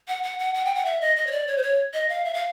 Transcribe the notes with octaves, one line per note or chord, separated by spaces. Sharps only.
F#5
F#5
F#5
F#5
G5
F#5
E5
D#5
D#5
C#5
D5
C#5
C5
C#5
D#5
F5
E5
F5